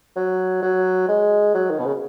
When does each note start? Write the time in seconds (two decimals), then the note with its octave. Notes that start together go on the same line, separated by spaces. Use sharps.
0.16 F#3
0.62 F#3
1.08 G#3
1.54 F#3
1.70 D#3
1.79 B2
1.86 C#3